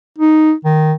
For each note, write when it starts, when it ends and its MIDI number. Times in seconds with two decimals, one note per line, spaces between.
0.18 0.54 63
0.65 0.93 51